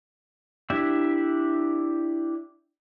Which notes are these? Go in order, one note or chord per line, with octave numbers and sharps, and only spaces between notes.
D4 E4 G4 E5